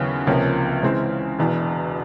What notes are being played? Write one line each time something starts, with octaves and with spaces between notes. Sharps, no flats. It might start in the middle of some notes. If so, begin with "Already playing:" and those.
Already playing: D#2 C#3 F#3 B3 E4
C#2 C3 F3 A#3 C#4
C#3 E3 G#3 C4
E1 E2 B2